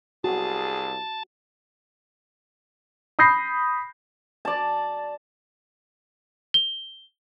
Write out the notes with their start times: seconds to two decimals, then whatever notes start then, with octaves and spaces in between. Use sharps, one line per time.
0.24 C2 F#4 G#4 A5
3.19 B5 D#6 G6 A#6 C7
4.45 D5 A5
6.54 G7